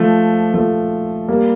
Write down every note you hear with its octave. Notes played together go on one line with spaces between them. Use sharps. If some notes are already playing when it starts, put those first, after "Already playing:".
Already playing: F3 A3
F3 A3
G3 A#3